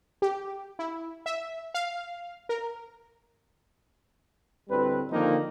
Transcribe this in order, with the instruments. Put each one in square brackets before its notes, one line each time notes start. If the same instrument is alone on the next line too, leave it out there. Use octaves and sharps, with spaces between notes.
[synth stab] G4
E4
E5
F5
A#4
[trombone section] D2 A2 G3 C4 B4
D3 D#3 F3 A#3 C4 D#4